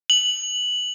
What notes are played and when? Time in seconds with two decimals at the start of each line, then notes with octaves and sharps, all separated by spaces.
0.10 F#7